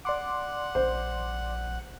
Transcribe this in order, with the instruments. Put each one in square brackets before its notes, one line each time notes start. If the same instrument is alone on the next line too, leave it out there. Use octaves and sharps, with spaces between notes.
[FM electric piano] D5 C6 D6 [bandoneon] F#5
[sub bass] A#1 [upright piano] C5